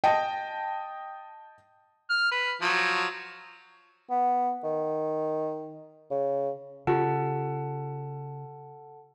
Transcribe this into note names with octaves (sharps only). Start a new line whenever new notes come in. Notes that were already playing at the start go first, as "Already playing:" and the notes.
D#5 G5 A5
F6
B4
F3 F#3
B3
D#3
C#3
C#3 F4 G4 A4 F#5 A5